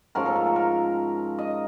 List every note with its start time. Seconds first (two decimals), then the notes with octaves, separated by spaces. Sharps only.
0.15 G#2 F3 A3 C#4 A#4
0.26 A4
0.35 A#4
0.46 A4
0.56 A#4
1.39 D#5